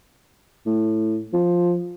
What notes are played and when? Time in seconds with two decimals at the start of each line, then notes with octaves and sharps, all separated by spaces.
0.66 A2
1.33 F3